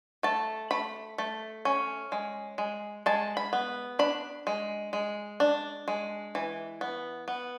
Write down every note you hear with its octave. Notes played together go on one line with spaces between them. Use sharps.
A3 A5
A3 B5
A3
C#4
G#3
G#3
G#3 A5
B5
B3
D4 B5
G#3
G#3
D4
G#3
E3
B3
B3